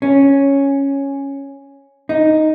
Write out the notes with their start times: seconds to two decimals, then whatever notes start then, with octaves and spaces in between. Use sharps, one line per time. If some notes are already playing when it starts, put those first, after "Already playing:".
0.02 C#4
2.09 D#4